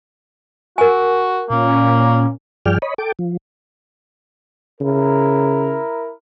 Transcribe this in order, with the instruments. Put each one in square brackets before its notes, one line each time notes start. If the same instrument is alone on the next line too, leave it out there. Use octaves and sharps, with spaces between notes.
[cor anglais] F#4 [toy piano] A#4 G#5
[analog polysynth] A#2 C#4 [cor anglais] A#3
[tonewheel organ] G2 F3 G#4 D5 G5 F6
C#5 D#5 B5
A4 G5 D6
F3
[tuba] C#3 [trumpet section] E4 A#4